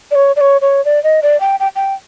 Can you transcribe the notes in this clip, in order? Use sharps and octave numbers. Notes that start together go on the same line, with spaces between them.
D5
C#5
D5
C#5
C#5
D5
D#5
D5
G5
G5
G5